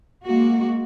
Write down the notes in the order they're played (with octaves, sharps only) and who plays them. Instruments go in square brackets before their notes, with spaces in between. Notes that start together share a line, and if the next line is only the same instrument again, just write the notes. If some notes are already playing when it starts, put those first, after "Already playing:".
[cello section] G#3 A#3 F#4